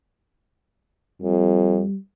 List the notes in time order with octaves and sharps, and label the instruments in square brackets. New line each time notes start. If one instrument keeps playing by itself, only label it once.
[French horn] F2 [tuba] G3